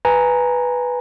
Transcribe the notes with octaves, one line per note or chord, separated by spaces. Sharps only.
B4 G#5 A#5